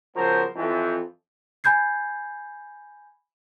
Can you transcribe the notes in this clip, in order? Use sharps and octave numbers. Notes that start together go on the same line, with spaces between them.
C#3 F3 F#3 B3 A#4 C5
F2 E3
G#5 B5 G6 G#6 C7